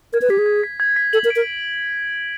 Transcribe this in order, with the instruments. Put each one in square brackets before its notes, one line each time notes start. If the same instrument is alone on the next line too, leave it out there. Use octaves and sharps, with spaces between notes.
[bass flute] A#4 [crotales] G#6
[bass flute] B4
[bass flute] G4 [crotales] B6
[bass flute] G#4
[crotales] G#6
B6
G#6
B6
[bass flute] A4 [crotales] F#7
[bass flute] A#4
[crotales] D7
[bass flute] A#4